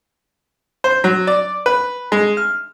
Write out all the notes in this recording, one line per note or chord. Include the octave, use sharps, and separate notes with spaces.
C5
F#3
D5
B4
G#3
F6